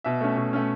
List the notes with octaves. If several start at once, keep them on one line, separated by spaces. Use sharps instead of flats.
B2 E5
A3 C#4
B2
A3 C#4